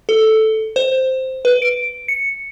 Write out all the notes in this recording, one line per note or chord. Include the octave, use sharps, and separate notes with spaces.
A4
C5
B4
D7
C#7